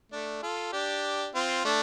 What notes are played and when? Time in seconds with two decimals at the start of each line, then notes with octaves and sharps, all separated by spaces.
0.12 A3 D4
0.42 F4 A4
0.73 D4 G4
1.35 C4 F4
1.65 A3 D4